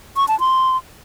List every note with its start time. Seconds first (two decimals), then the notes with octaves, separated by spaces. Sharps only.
0.17 C#6
0.28 A5
0.40 C6